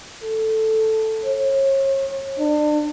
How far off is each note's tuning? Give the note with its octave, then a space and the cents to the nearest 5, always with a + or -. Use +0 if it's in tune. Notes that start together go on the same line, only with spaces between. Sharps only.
A4 +0
C#5 -35
D4 +35